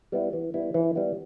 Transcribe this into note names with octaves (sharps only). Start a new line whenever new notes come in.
G3 B3 E4
E3
G3 B3 E4
E3
G3 B3 E4